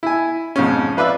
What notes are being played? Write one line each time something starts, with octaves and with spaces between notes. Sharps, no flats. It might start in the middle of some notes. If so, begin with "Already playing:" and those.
E4 G#5
F2 G#2 C#4
F4 B4 D5 E5